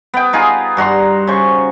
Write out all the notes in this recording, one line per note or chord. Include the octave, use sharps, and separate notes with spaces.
B3 G5
D#4 F4 G#4
G2 F#4 A#5 C6
C#3 C5 C#6